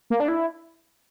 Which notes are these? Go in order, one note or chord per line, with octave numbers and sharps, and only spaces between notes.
A#3
D4
E4